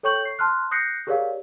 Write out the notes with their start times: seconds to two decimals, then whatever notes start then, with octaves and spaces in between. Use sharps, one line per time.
0.03 A4 C#5 G5 C#6 G6 F#7
0.25 C7
0.39 A5 C6 F6 F#6
0.71 D#6 F#6 G6 A#6 C7 C#7
1.07 G4 G#4 A#4 C#5 D5 F5